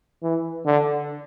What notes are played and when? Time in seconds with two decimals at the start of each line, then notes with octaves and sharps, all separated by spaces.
0.23 E3
0.66 D3